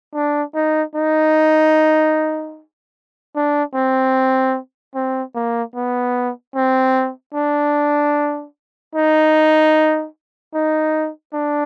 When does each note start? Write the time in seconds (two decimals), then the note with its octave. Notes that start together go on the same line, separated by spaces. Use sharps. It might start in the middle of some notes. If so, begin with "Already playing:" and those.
0.15 D4
0.55 D#4
0.95 D#4
3.36 D4
3.75 C4
4.95 C4
5.35 A#3
5.75 B3
6.55 C4
7.34 D4
8.95 D#4
10.54 D#4
11.34 D4